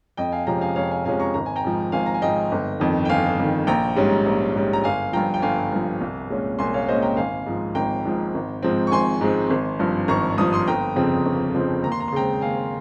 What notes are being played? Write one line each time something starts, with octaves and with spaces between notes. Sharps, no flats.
F2 D#5 G5
F5 G#5
C3 F3 G#3 C#4 G5 A#5
F5 G#5
F2 C#5 F5
F5 G#5
C3 F3 G#3 C#4 F5 G#5
A#5 C#6
G#1 A#5
G#5
G5 A#5
G#2 F3
G#1 F5 G#5
A#5
G#5
G#2 F3 D#5 G5
G1
F2 D#3
G5
G1 F5 G#5
F2 D#3
A#1 G5 A#5
G#2 G3 C#4
A#1
G#2 G3 C#4
A#5
G1 F5 G#5
G2 F3 G5 A#5
G5
G1 F5 G#5
G2 F3
C2
A#2 G#3 C#4
C2 G#5 C6
C#5 F5
A#2 G#3 C#4 C5 D#5
G5 A#5
G#1 F5 G#5
G#2 F3
G#1 G5 A#5
G#2 F3
G#1
G#2 F3 G#3 C4
C#6
G#1 G#5 C6
G#2 F3 G#3 C4
G#1
G2 F3
G#1 A#5 C#6
G2 F3 D#6
C6 D#6
G1 G5 A#5
F2 C#3 F3 C4
G1
F2 C#3 F3 C4
D#2 A#5
C6
A#5
C6
C#3 G#3 C4 G5 A#5
D#2 F5 G#5